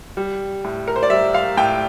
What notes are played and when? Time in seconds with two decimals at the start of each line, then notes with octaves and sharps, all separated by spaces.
0.17 G3
0.64 A2
0.88 A#4
0.96 C5
1.03 D5
1.10 G3 E5
1.34 F5
1.57 A2 G5